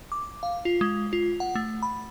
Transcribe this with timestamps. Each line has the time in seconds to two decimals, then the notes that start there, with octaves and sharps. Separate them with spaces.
0.12 D6
0.43 F5
0.65 F4
0.81 G#3
1.13 F4
1.40 F#5
1.55 A3
1.83 B5